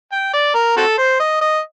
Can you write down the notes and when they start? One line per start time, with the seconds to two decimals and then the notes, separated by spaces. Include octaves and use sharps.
0.12 G5
0.33 D5
0.55 A#4
0.77 C4 F#4 A4
0.98 C5
1.20 D#5
1.41 D#5